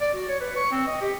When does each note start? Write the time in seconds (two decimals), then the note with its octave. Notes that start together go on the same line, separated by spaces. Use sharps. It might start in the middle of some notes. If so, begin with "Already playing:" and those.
0.01 D5
0.14 F#4
0.28 C#5
0.41 B4
0.56 C#6
0.72 C4
0.87 D#5
1.01 G4